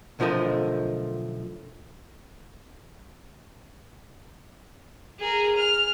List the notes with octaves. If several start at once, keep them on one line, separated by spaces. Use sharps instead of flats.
B1 D3 F3 A3 A#4 D#5
G#4 A#4
F6